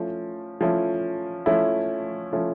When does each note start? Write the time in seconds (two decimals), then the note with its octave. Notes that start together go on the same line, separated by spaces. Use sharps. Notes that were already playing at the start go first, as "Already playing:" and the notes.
Already playing: F3 A3 C#4 E4
0.61 F3 A3 C#4 E4
1.46 F3 A3 C#4 E4
2.33 F3 A3 C#4 E4